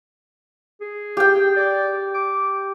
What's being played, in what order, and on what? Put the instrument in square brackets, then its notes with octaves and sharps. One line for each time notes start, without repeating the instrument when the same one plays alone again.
[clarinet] G#4
[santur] G4 G5
[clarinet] D5
D6